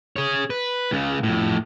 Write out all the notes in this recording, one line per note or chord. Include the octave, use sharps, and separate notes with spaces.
G#4 C#5
B4
C#2 C#3
F2 A2